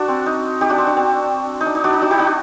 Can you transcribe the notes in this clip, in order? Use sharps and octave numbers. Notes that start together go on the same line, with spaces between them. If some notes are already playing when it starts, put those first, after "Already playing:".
Already playing: D4 F#4
C4
D#4
D#4 G4
D4 F#4
C4
D4
C4
D#4
D4
D#4
D4 F#4
D#4
D4 F#4
D#4 G4
D4 F#4